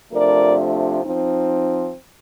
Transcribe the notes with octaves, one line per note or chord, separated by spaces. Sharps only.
C3 F3 A3 D4 A#4 D5
F3 C4 D#4